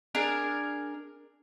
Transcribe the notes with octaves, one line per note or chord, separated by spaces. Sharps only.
D4 G#4 A#4